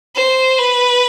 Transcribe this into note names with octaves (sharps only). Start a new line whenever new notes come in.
C5
B4